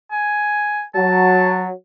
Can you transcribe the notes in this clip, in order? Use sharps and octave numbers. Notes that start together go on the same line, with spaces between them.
G#5
F#3 A5